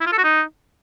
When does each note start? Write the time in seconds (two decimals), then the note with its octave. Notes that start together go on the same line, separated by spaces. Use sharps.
0.01 E4
0.06 F4
0.12 A4
0.18 F#4
0.24 D#4